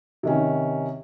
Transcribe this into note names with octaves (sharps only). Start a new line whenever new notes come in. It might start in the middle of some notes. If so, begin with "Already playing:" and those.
C3 D#3 C#4